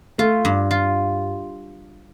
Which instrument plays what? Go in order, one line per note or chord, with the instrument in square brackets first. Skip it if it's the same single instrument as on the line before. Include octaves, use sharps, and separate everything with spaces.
[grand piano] A3 [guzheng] F4
[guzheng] G2
F4